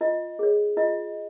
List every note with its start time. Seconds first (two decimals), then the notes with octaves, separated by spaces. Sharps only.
0.01 F4 D#5
0.39 G#4 C#5
0.77 F4 D#5